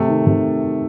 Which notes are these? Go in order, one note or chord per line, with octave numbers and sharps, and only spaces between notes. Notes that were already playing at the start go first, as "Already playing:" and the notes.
Already playing: C3 A3 A4
D#3
C3